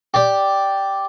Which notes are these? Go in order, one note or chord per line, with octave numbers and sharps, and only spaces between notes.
G4 D5